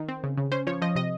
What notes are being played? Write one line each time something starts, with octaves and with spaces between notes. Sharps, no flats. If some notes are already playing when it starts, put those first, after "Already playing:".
Already playing: D#3
C4
C#3
C#3
C#4 C5
F3 C#5
F3 D#5
C3 D#5